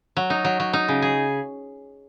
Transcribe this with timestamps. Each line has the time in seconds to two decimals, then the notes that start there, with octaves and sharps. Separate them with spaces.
0.17 F#3
0.30 D#4
0.45 F#3
0.60 F#3
0.73 D#4
0.88 C#3
1.02 G#4